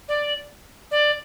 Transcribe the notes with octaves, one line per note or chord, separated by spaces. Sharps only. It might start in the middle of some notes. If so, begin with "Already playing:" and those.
D5
D5